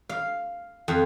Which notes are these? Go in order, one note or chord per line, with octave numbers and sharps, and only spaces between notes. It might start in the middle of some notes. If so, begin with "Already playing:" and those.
F5
F2